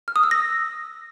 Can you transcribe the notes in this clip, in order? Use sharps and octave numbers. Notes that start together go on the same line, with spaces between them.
F6
D#6
E6
A#6